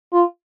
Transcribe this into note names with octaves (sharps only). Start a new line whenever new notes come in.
F4